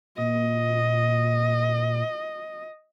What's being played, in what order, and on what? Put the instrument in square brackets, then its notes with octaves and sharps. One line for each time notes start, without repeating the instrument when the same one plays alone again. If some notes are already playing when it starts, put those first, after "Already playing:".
[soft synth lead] A#2 [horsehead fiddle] D#5